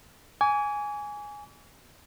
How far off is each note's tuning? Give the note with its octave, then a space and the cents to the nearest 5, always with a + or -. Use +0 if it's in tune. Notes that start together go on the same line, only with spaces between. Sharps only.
G#5 +0 D6 -45